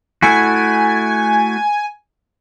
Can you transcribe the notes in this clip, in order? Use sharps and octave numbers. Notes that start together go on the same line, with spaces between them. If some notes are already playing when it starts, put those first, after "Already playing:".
A3 E4 F#4 G#5